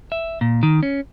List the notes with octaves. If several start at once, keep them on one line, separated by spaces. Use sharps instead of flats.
E5
A#2
D#3
C#4